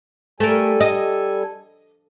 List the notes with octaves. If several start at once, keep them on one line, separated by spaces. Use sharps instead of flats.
G3 A3 A4 A#4 G#5
D#5